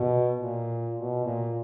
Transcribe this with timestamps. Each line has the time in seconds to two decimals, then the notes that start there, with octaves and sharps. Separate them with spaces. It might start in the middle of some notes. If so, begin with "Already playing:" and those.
Already playing: B2
0.37 A#2
0.96 B2
1.24 A#2